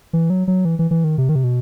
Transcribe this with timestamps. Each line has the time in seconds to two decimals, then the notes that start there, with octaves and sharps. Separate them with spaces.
0.13 E3
0.30 F#3
0.47 F#3
0.65 E3
0.79 E3
0.91 E3
1.04 D#3
1.18 C3
1.29 D#3
1.35 C3
1.44 B2